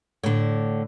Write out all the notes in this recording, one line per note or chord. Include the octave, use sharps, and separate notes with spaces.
A2 D3